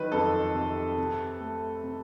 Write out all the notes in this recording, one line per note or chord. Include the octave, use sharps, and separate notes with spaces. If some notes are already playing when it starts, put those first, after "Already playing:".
Already playing: D#3 F#3 B4
F2 A4
C3
C3
A3
C3